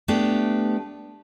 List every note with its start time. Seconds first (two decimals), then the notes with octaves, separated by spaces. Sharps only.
0.08 A3 B3 D4 G4